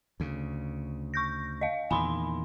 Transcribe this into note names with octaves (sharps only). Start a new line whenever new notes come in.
D2 C#3
C#6 G6 A#6
D#5 F5
E2 A#2 D#3 G#5 B5 C6